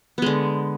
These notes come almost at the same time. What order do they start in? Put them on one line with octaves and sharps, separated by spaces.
B3 G#3 D3